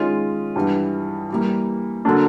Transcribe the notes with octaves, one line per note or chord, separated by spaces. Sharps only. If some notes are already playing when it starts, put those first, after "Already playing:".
Already playing: D#3 G#3 C#4 F4
G2 E3 G3 B3
E3 G3 A#3
D3 F#3 A#3 D4